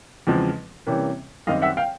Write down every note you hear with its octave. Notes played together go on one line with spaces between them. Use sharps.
E2 C#3 F3 G#3 C4
C3 E3 G3 A#3 C#4
F#2 D#3 G3 C4 D#5 F5
E5 F#5
F5 G5